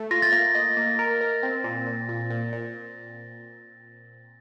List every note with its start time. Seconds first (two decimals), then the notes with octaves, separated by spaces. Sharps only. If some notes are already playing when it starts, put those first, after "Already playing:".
Already playing: A3
0.11 F4 A#6
0.22 A6
0.32 A#3 A#6
0.55 D#5
0.77 A#3
0.99 A#4
1.21 A#4
1.43 C4 A#6
1.64 A#2
1.87 A#2
2.09 A#2
2.30 A#2
2.53 A#2